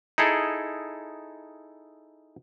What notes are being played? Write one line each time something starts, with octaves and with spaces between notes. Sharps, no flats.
D#4 E4 G#4 A4